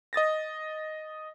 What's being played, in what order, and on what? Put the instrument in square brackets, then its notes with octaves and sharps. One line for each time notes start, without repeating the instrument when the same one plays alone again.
[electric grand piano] D#5 D#6 A6 A#6